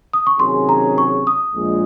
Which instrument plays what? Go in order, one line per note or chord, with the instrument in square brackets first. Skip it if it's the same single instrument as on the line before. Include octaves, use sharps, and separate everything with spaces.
[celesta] D#6
C#6
[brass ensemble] C3 D#3 F#3 C#4 G#4 [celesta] C6
[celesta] A#5
C#6
D#6
[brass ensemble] A#1 A#2 G#3